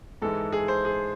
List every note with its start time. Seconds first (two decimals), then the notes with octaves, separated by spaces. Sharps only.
0.22 G#2 E3 G#3 A4
0.52 G#4
0.68 C5
0.85 G#4